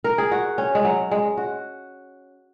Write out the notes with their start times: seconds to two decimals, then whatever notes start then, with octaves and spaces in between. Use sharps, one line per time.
0.04 A#4
0.18 G#4
0.32 F#4
0.58 C#4
0.75 G#3
0.85 F#3
1.11 G#3
1.37 F#4